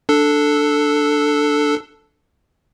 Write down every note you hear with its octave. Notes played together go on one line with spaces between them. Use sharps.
D4 A4